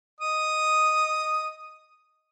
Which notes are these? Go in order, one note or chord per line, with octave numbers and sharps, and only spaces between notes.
D#5 D#6